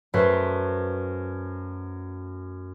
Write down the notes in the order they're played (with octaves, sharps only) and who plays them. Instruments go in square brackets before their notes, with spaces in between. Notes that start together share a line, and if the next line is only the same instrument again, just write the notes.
[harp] F#2 A3 B4 C5 B6